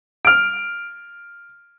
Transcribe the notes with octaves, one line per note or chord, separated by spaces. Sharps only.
F6 D7